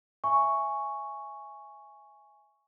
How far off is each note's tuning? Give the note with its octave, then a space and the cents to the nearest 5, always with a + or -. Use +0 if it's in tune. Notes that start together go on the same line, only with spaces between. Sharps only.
E5 +0 G#5 +0 C#6 +0